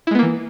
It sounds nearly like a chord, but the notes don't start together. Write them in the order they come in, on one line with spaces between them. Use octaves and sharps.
E4 G#3 B3 A#3 E3